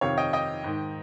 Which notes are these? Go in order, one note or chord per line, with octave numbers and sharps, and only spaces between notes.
F2 C3 D#3 C#5 F5
D#5 G5
D#5 G5
G#2 D#3